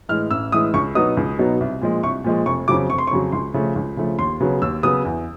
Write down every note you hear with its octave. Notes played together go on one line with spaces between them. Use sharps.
A2 E3 G#3 F6
A1 E6
A2 E3 G#3 D#6
C#2 C#6
B2 F#3 B3 D#4 D#6
C#2
B2 F#3 B3 D#4
C2
A#2 F3 G#3
C2 C#6
A#2 F3 G#3
F1 C#6
F2 C#3 F#3 D6
F1 C#6
C6
C#6
F2 C#3 F#3
C#2 C6
C#3 F3 A3
C#2
C#3 F3 A3
D#2 C6
C#3 F#3 B3
D#2 E6
C#3 F#3 B3 D#6
E2